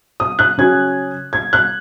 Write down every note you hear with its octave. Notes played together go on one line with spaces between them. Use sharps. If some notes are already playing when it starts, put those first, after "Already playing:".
D#6
F#6
C#3 F#3 C#4 G#6
G#6
F#6